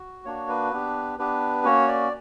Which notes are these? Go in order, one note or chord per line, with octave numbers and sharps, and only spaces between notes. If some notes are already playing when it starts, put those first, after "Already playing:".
Already playing: F#4
A#3 D4 F#4 C#5
B4
B3 D4 G4
B3 D4 G4 B4
A#3 C#4 F#4 C#5
D5